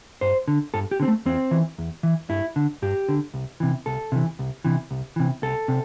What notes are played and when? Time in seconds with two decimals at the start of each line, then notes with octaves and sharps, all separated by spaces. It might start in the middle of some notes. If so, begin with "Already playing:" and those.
0.21 G2 C5
0.48 D3
0.74 G2 A4
0.91 G4
1.00 D3
1.02 C4
1.08 A3
1.25 E2 C4
1.51 E3
1.78 E2
2.03 E3
2.30 G2 E4
2.56 D3
2.82 G2 G4
3.09 D3
3.34 C2
3.60 C3 E3
3.86 C2 A4
4.12 C3 E3
4.39 C2
4.65 C3 E3
4.91 C2
5.16 C3 E3
5.43 C2 A4
5.68 C3